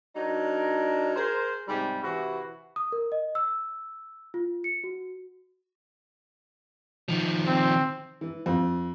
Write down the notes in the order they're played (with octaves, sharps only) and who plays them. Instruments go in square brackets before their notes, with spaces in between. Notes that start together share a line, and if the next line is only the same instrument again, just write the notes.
[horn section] F#3 D4 D#4 A#4
G#4 A#4 C5
G#2 C3 G3
C3 E3 E4 F#4
[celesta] D#6
A#4
D#5
E6
F4
C#7
F#4
[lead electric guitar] D#3 F3
[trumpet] C4
[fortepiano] E3
F2